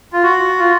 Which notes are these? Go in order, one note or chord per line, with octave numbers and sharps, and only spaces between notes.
F4
F#4
F4